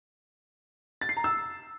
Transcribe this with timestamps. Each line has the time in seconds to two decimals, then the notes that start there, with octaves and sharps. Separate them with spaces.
1.01 A6
1.09 C7
1.17 A#5
1.24 E6